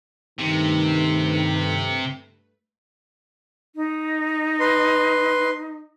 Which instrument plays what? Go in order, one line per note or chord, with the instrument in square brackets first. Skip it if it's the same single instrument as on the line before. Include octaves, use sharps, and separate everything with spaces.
[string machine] G2 A3 B4 [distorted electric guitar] C3 [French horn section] D#3
[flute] D#4
[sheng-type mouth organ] B4 C6